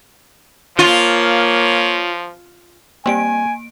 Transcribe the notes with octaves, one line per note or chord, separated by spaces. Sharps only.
F3 A#3 F4 C#5
G3 A#3 C4 G#5 D7